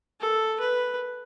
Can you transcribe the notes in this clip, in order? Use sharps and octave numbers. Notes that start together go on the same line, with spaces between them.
A4
B4